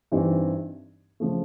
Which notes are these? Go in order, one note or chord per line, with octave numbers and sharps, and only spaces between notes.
G2 E3 G3 C4 D#4
C#3 F3 A3